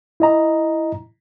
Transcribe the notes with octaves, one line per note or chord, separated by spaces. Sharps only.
E4 D#5 A#5